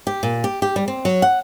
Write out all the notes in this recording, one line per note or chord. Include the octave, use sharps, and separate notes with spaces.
G4
A#2
G4
G4
G3
C4
F#3
F#5